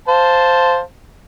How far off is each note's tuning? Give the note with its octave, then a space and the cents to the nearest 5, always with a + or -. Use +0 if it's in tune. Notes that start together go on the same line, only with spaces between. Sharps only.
C5 +0 F5 +0 A5 +0